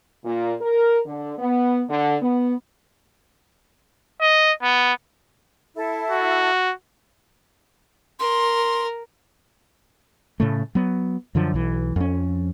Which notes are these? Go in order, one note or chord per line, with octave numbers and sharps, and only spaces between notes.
A#2
A#4
D3
B3
D3
B3
D#5
B3
E4 A4
F#4
A#4 C6
A2 C#3 A3
F#3 B3
F#2 D3 F3
B1 E3
F2 C#4